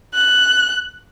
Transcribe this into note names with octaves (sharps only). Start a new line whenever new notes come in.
F#6